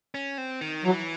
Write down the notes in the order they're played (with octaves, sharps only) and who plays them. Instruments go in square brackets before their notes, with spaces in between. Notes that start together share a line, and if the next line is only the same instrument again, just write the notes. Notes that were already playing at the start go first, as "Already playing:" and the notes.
[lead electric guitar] C#4
C4
D#3
[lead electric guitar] E3 [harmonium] F#3